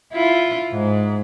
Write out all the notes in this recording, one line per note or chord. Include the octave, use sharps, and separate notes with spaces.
E4 F4
G#2